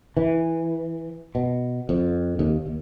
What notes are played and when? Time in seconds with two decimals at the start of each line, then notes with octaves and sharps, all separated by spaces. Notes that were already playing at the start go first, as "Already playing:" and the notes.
0.17 E3
1.35 B2
1.89 F2
2.39 D#2
2.66 D#2